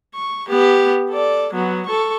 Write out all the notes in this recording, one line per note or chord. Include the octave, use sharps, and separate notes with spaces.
C#6
B3 G4
A4 D5
F#3 B3
A4 C#6